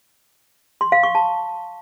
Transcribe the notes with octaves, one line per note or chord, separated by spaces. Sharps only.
C6
F5
C#6
A5